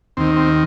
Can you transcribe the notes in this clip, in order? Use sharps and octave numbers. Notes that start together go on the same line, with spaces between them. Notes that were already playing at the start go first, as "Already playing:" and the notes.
D#2 D#3 C4
C4